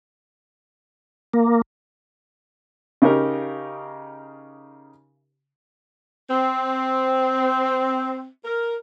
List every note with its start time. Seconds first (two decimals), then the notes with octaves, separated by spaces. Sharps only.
1.34 A#3
3.02 C#3 D#4 G4 A#4
6.30 C4
8.45 A#4